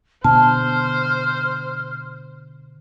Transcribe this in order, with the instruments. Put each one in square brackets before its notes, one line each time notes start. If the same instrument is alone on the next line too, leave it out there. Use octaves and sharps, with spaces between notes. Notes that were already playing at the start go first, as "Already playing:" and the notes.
[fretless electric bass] B2 D3 B3 [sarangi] C5 [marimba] A5 [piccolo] F6